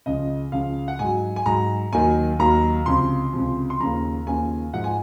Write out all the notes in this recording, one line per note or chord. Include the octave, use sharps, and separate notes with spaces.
C#2 C#3 F3 D#5
C#2 C#3 F3 F5
F#5
G#2 F#3 G#5
G#5
G#2 F#3 A#5
D#2 D#3 F#3 G#5
D#2 D#3 F#3 A#5
C#2 C3 F3 C6
C#2 C3 F3
C6
D#2 C#3 F3 A#5
D#2 C#3 F3 G#5
G#2 F3 F#5
G#5